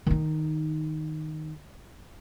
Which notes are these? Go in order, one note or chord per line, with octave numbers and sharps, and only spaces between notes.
D#3 D#4